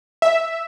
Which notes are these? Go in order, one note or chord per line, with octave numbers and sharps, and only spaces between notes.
E5